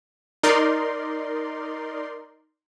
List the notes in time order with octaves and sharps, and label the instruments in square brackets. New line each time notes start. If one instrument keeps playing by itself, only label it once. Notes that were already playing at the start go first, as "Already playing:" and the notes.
[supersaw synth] D#4 A#4 D5 C6